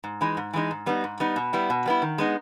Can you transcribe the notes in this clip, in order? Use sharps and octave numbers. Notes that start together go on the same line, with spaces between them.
G#2
E3 G#3 D#4
G#2
E3 G#3 D#4
G#2
G3 B3 D#4
G#2
G3 B3 D#4
B2
G3 B3 E4
B2
G3 B3 E4
D#3
G#3 B3 D#4